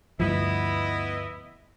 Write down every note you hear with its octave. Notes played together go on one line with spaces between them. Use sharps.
D2 G2 F3 B3 E4 D#5